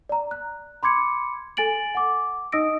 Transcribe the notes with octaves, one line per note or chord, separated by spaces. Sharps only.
D5 A#5
F#6
B5 C6 D6 G#6 C#7
A4 G#5 A6 D7 F#7
F#5 D6
D#4 D#5 D#6 E6 A#6 D7